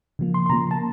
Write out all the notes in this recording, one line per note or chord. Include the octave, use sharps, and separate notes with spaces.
C#3 F3 A#3
C6
C6
C#3 F3 A#3 A#5
A5